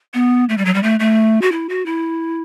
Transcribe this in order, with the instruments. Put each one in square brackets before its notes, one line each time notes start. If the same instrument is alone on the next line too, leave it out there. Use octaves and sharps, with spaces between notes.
[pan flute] B3
A3
G3
F#3
G3
A3
A3
F#4
E4
F#4
E4